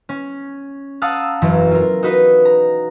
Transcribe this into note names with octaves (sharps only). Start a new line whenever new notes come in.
C#4
F5 F#5 A5 A#5 D#6 E6
E1 F#2 E3 F#3 A#5
F4 A#4
D#4 F#4 B4 D#5
A#5